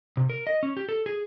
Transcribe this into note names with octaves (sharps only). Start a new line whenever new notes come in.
C3
A#4
D#5
C#4
G4
A4
G#4